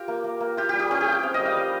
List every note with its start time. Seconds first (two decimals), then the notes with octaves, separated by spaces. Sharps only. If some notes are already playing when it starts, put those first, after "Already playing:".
Already playing: F4 G4 A#4
0.08 A#3
0.24 A#3
0.41 A#3
0.57 F4 G4
0.69 G3 G4
0.79 G4
0.91 C#4 G4
1.01 G#4
1.08 F4 G5
1.23 C4 F5
1.34 D#5
1.40 G3
1.45 F5
1.57 G3